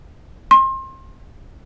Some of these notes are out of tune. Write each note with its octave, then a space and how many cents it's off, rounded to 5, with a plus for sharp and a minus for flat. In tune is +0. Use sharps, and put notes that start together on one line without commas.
C6 +30